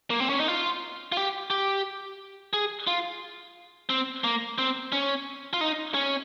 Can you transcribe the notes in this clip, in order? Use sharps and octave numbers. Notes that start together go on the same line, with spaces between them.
A#3
C4
C#4
D#4
F4
F4
G4
G4
G#4
F4
C4
A#3
C4
C#4
F4
D#4
C#4